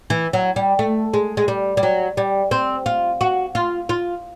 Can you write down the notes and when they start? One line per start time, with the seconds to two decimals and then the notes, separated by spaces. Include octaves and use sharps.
0.10 E3
0.33 F#3
0.56 G3
0.79 A3
1.14 G#3
1.37 G#3
1.48 G3
1.77 G3
1.83 F#3
2.17 G3
2.51 C4
2.86 F4
3.21 F#4
3.55 F4
3.89 F4